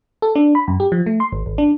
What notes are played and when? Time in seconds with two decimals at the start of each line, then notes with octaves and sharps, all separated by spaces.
0.22 A4
0.35 D4
0.55 B5
0.68 F#2
0.80 G4
0.92 F3
1.06 A3
1.20 C6
1.33 G#1
1.46 G#1
1.58 D4